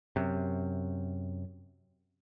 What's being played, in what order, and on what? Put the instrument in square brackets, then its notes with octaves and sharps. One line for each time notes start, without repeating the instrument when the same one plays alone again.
[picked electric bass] F#2 C3